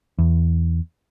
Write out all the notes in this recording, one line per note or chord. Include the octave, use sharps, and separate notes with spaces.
E2